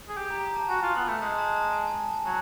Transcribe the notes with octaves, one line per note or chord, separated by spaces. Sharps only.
G#4
G4
A#5
A#5
A5
F#4 G#5
F4
B3
A3
G#3 A5
A5
A5
G#5
G#5
A5
G#5
F#3 A5